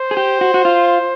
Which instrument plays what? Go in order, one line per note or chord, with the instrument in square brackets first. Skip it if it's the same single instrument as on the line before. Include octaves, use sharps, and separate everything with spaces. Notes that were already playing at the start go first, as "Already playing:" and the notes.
Already playing: [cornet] C5
[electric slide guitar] G#4
G4
F#4
F#4
F4